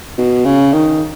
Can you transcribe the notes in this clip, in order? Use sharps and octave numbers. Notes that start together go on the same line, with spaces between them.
B2
C#3
D#3